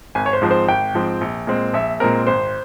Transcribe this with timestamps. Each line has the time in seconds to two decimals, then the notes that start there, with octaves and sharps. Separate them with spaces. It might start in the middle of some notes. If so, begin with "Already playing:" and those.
0.15 G#1 G#5
0.26 C#5
0.33 C5
0.42 G#2 F3 C4
0.51 C5
0.68 G#1 G5
0.94 G#2 F3 C4
1.21 A#1
1.47 A#2 G#3 C4
1.73 A#1 E5
2.00 A#2 G#3 C4 A#4
2.27 G#1 C5